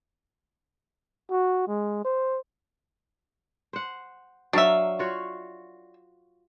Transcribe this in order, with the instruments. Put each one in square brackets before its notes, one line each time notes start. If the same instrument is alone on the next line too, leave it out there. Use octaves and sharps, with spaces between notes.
[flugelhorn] F#4
G#3
C5
[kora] C5 F#5
[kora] F#3 A#4 F5 [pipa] D4 E5
[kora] F4 F#4 C#5